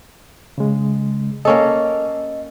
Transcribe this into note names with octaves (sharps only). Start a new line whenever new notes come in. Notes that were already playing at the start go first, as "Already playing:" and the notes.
C#3 G#3
A#3 C#4 A4 D#5